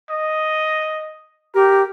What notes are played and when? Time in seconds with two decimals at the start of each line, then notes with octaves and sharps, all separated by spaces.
0.11 D#5
1.55 G4 A#4